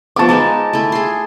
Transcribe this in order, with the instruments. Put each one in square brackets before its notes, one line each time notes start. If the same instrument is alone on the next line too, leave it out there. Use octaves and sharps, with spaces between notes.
[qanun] F3 B3 [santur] A5 D6
[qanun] G#3 D#4 A#4
A3 E4
G#4 C6